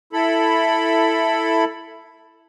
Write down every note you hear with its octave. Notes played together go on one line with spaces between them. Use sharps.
E4 A4 B5